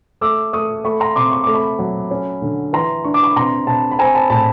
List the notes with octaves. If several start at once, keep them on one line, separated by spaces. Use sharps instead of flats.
A3 D6 E6
A3 C#6 D#6
A3 B5 C#6
A#5 C6
C3 C6 D6
C#6
A3 D6
B5 C#6
F#3
C#4
D3
E3 A#5 C6
D4 C#6
D6
B5 C#6
C3 A#5 C6
C3 A5 B5
B5
C4 G#5 A#5
A5 B5
A2 A5 B5